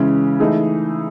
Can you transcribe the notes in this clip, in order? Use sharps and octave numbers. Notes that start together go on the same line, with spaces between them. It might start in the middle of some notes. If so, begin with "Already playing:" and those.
Already playing: C#3 E3 G#3 C#4
E3 A3 D#4 G#4